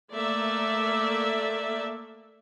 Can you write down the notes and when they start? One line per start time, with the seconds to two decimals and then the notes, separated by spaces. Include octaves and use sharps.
0.13 A3 A#3 D5 E5